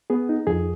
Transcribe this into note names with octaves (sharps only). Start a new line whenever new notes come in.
B3 G#4
D#4
F2 G#4